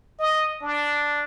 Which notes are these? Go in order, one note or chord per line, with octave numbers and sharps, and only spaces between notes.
D#5
D4